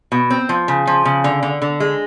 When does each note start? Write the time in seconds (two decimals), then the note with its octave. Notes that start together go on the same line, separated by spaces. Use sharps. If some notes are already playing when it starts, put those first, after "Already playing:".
0.12 B2
0.30 C4
0.49 F3
0.68 C#3
0.87 F3
1.05 C#3
1.24 D3
1.43 D3
1.62 D3
1.80 G#3